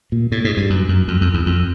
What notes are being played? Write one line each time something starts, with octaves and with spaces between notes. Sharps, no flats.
A#2
A2
G#2
G2
F#2
F#2
F2
F2
E2
F2